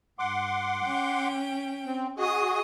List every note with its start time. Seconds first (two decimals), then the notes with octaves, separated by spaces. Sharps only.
0.19 G2 F#5 C6 D6
0.83 C#4 G5
1.86 C4
2.18 F#4 G#4 D#5 D#6